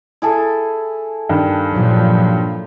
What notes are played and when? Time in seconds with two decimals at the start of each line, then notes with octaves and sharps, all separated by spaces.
0.22 E4 G#4 A4
1.29 G2 D#3
1.74 A#2 F3 F#3